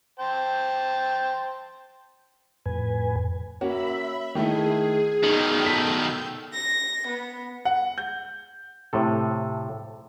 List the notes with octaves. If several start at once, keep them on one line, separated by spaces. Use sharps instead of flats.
C5 G5 A5
F2 A2 B4 G#5
A#3 C#4 F#4 E5 B5
D#3 A3 E4 G#4
B2 D#3 D#4 G5 E6 G6
A4 B6
A#6
B3
F#5
G6
A2 C3 A4